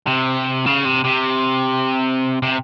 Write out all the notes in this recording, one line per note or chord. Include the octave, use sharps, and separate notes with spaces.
C3
C#3
C3
C3
C3